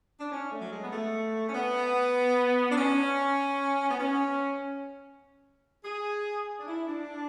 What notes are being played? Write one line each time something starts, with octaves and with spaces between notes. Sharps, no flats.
D4
C#4
A3
F#3
G#3
B3
A3
C#4
B3
D4
C#4
B3
C#4
G#4
D4
E4
D4